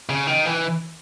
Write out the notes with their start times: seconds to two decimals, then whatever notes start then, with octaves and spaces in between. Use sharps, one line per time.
0.09 C#3
0.27 D#3
0.46 E3